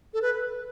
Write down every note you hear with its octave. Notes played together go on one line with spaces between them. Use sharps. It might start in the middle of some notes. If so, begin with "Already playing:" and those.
A4
B4